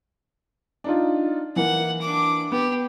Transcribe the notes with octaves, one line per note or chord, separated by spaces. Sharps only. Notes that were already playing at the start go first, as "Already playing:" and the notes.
D4 D#4 F4
E3 A#3 F#5
D4 D6
B3 G4